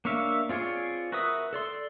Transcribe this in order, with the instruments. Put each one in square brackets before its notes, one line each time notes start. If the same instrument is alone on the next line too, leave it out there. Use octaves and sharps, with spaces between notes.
[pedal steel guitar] A#3 D4 C#5 E5 F5
C4 F4 G#4 C#5 D5
F#4 A#4 B4 E5 D#6
A4 D5 C6